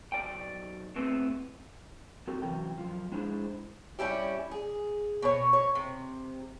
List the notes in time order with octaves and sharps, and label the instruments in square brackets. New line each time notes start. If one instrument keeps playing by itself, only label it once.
[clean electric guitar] B1 D5 G5
A2 B3 C4
[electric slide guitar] C4 F#4 G4 A4 A#4
C3 E3 F#3 C#4 G5
F#2 F3
G#3 D4 E4 G#4 C5
[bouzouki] G3 C#4 E4 G4
G#4
B2 C#5
C#5
C3